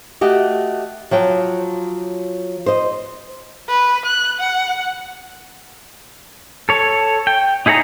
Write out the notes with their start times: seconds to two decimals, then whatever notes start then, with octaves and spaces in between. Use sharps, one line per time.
0.21 A3 F#4 G4 D#5
1.11 F3 F#3 G5
2.66 C5 D#5
3.69 B4
4.05 F#6
4.40 F#5
6.69 A4 C#5
7.27 G5
7.66 D#4 E4 G#4 C#5 A#5